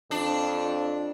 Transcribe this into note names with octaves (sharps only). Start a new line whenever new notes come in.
F2 D4